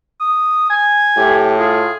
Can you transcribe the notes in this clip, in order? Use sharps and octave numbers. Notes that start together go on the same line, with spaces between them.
D#6
G#5
A2 G4
F4 G#4